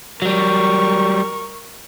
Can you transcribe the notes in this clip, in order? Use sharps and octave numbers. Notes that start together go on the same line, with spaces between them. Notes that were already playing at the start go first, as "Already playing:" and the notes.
F#3 G3 A#4 C#6